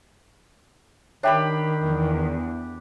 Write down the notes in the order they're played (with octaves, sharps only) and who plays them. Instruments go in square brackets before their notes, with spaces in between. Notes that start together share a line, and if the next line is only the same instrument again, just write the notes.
[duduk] D#3 [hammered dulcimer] D4 G4 B5 [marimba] C#5 E5 G5
[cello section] E2